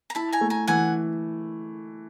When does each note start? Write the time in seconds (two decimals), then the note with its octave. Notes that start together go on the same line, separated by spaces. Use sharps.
0.10 A#5
0.15 E4 A5 B5
0.33 G#5 A#5
0.41 A3
0.50 G#5 A#5
0.67 E3 F#5 G#5